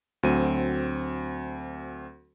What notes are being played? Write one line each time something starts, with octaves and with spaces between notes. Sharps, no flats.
D2 F#3 C4 D#7